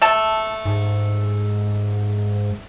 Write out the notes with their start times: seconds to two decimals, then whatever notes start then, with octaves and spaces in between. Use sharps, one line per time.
0.02 A3 A5
0.65 G#2